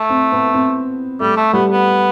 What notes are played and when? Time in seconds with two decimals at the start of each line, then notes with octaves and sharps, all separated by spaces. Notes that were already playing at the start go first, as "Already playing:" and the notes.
Already playing: A3
0.10 C4
0.32 B3
0.54 C4
1.20 G3 A3
1.37 A3
1.53 G3 B3
1.70 B3